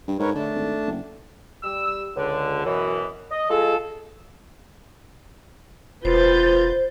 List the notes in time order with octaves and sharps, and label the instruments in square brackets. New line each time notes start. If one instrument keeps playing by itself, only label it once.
[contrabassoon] G2
[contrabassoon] G#2 [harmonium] A#4 B4 C#5
[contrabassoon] D3 [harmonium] A3 D4 A5
[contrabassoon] G#1
F#1
[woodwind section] G3 E6
C#2 D3
F#2 B2 E3
D#5
G#3 F4 G#4 A4
[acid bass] E1 [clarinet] F4 [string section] B4 G6 A6 [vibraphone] C5